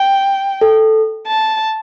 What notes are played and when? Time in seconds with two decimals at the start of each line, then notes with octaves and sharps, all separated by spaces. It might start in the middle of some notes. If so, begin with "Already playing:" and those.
Already playing: G5
0.61 A4
1.27 A5